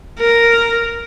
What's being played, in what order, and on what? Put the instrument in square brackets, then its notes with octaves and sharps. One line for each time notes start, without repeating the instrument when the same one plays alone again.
[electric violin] A#4